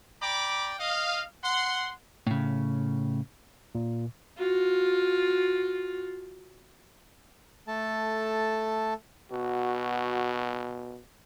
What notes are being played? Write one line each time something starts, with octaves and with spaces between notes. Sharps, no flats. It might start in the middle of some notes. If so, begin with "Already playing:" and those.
D5 G5 A#5 B5 D6
D#5 F5
F#5 C6
A2 C#3
A#2
F4 F#4
A3 A4 A5
B2 F#4